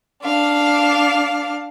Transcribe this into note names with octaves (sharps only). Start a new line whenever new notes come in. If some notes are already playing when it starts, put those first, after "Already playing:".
D4 F5